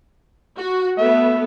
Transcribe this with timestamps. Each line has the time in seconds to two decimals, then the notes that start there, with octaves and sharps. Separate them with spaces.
0.58 F#4
0.98 A3 B3 E5